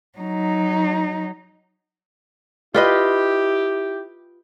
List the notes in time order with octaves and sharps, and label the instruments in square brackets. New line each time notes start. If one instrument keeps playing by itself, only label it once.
[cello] F#3 D#4
[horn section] E4 G4 [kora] F4 B4 D#5